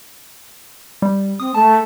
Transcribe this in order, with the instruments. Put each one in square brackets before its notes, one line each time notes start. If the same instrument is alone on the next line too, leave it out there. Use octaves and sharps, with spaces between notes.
[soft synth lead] G3
[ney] C4 [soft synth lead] D#6
[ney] A3 [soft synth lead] A5